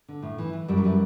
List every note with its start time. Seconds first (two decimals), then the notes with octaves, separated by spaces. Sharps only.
0.08 D3
0.23 A2
0.38 E3
0.53 E3
0.68 F#2 G3
0.77 F#3
0.84 E3 G3